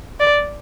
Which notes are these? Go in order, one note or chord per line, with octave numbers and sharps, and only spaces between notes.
D5